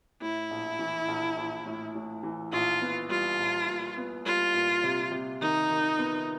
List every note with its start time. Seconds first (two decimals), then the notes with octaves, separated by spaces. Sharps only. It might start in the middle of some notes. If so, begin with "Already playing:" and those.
0.22 A2 E4
0.51 A#1
0.79 E3
1.08 A#1
1.37 A#1
1.66 A2
1.95 A2
2.23 E3
2.52 A#1 F4
2.82 B3
3.10 G3 F4
3.39 A#1
3.67 A#2
3.97 B3
4.26 G3 F4
4.54 A#2
4.84 C3
5.12 C3
5.41 D#3 D#4
5.70 D#3
5.99 B3